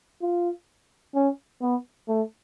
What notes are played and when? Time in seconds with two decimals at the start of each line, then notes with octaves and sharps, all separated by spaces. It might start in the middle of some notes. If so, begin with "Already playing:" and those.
0.22 F4
1.15 C#4
1.62 B3
2.08 A3